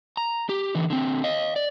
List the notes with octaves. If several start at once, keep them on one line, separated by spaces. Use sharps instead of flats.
A#5
G4
D3 E3
D3 C4
D#5 F5
D5